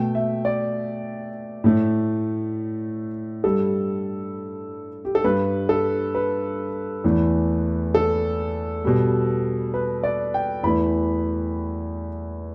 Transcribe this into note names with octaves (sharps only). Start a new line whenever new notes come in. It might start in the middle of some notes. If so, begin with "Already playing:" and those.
Already playing: B2 A3 G5
E5
D5
A2 A3
G2 G3 A4
G4
A4
G2 G3 B4
A4
B4
E2 E3 A3
A4
B2 G3
B4
D5
G5
E2 E3 A3 B5